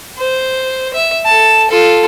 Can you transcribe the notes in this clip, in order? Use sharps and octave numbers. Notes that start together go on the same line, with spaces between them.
C5
E5
A4 A5
F4 A4